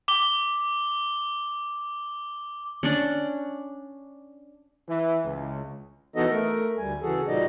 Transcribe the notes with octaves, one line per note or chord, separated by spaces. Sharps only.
D6 G7
C#4 D4 D5
E3
C#2
E3 B3 D#4 F#4 A4 D#5
A3 A#4
D2 G3 G#5
C#3 E3 F#4 G#4 A4
A#2 G3 D#4 F#4 D5 D#5